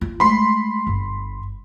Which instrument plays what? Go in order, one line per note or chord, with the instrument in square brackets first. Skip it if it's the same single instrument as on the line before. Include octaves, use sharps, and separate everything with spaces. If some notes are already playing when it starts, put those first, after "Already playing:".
[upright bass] F4
[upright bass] G#3 A3 [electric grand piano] B5 C6
[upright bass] G1